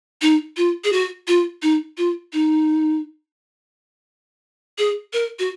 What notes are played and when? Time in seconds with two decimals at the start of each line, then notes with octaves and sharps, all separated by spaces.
0.22 D#4
0.57 F4
0.84 G#4
0.93 F#4
1.28 F4
1.63 D#4
1.98 F4
2.33 D#4
4.78 G#4
5.13 A#4
5.39 F#4